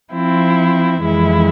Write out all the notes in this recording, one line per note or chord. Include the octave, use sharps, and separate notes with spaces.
F3 C4 E4
F2 E3 G#3 E4